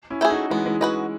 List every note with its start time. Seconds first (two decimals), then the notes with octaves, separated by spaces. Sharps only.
0.10 C#4 E4
0.21 A3 E4 G#4
0.30 D#4 F#4
0.50 E3 G#3 B3
0.65 E3 G#3
0.81 E3 F#4 B4 D#5